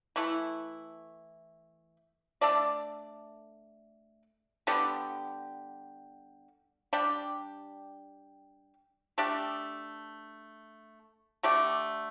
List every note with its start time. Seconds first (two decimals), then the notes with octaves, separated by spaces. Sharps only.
0.16 E3 A3 E4
2.41 A3 D4 A4 D5
4.67 D3 G3 B3 G4
6.93 G3 D4 G4
9.18 A3 D4 G4
11.43 D3 A3 G4 D5